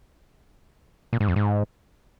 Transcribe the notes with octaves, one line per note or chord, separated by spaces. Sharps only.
A#2
G#2
F2
G#2